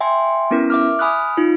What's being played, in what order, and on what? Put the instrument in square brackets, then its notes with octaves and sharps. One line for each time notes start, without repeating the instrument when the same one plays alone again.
[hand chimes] E5 G5 G#5 C6
B3 C#4 E4 A#4
E5 D6 F6
G#5 B5 D#6 F6 F#6
D#4 F4